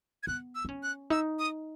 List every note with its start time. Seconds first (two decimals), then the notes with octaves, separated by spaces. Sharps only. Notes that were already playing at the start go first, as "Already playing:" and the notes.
0.23 G#6
0.27 B3 F#6
0.55 E6
0.65 D#4
0.69 C#4
0.83 F#6
1.10 D#4 E6
1.39 D#6